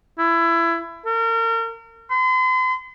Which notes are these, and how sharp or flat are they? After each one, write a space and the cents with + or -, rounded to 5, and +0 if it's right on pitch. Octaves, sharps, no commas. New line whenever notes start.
E4 +25
A#4 -35
C6 -40